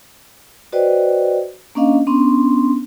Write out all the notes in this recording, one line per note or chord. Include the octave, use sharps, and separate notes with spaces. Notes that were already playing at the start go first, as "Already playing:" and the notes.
F#4 B4 C5 D5 D#5 G5
A#3 C#4 D4 D#5 F5
B3 C#4 D4 C6